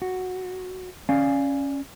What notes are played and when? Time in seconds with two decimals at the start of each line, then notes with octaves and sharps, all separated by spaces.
0.02 F#4
1.09 C#4 D5 F5 G#5